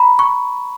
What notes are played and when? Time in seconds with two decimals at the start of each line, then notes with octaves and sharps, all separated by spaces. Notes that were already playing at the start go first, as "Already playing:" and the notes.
Already playing: A#5 B5
0.19 C#6